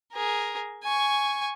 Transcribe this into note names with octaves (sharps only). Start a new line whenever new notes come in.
G#4 A#4
G#5 C#6